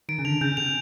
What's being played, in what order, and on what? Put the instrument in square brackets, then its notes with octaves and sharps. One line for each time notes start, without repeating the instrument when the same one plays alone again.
[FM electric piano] D#3 [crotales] D7
[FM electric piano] C#3
[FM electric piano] D3 [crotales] F7
[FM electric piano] C#3 [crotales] G6
[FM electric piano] C#3
[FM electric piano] C3 [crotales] F7